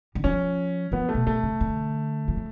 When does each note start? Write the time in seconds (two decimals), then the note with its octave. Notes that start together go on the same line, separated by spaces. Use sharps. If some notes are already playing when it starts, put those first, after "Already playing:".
0.15 D3
0.24 F3 C#4
0.92 F3 B3
1.09 A3
1.14 B2
1.27 B2 A3
1.43 C#3
1.60 D3
2.28 F3
2.36 C#3